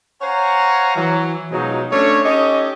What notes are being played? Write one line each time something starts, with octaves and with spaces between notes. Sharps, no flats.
C5 C#5 F5 F#5 G#5 A#5
E3 F#3
B2 F3 F#3 G#3 D#4
A3 C#4 D4 C#5
C#4 D#4 G4 A4 D#5